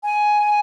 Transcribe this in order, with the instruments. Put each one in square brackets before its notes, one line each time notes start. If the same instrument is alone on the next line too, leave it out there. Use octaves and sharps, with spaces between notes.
[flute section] G#5